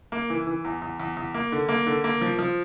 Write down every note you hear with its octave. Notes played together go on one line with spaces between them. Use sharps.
A#3
E3
E3
E2
E2
E2
E2
A#3
D3
A#3
D3
A#3
F3
F3